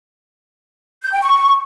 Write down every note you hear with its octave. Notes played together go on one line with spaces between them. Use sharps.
G6
G5
C#6